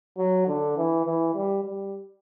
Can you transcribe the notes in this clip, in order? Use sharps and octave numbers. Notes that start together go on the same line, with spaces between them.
F#3
D3
E3
E3
G3
G3